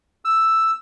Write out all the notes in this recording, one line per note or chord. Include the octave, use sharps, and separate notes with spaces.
E6